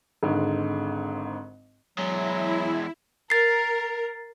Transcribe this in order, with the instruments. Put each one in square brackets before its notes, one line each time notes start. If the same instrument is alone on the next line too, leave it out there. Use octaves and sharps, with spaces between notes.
[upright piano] G#1 G#2 D3
[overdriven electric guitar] E2 G#3 [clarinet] F#3 [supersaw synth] E4
[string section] A#4 [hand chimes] A6 C7